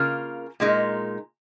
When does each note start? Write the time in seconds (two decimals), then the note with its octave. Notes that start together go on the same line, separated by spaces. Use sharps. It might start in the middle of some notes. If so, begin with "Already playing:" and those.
Already playing: C#3 A#3 F4 A#4
0.60 A#2 G#3 D#4 A#4